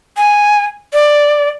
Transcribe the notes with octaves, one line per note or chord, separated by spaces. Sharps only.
G#5
D5